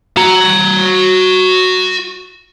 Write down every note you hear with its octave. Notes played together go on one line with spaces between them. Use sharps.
F#4 A#5